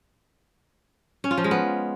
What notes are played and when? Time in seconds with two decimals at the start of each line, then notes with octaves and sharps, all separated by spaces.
1.24 C#4
1.31 F4
1.37 F3
1.44 G#3
1.51 B3